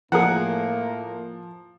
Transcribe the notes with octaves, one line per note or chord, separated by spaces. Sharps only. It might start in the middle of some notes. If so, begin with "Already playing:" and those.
A2 F3 A#3 G#4 A#4 F#5